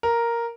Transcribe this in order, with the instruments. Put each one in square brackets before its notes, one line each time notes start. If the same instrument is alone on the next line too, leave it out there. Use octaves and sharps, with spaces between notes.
[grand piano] A#4